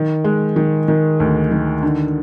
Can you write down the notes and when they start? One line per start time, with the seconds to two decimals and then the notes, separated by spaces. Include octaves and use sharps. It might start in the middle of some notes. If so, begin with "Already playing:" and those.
Already playing: D#3
0.24 G#3
0.56 D#3
0.88 D#3
1.20 D2
1.51 D#3
1.83 D3